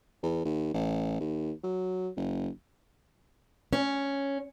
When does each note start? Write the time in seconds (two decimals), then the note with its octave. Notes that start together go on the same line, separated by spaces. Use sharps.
0.23 E2
0.45 D#2
0.74 A1
1.20 D#2
1.63 F#3
2.17 F#1
3.73 C#4